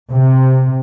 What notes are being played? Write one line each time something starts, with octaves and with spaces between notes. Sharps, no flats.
C3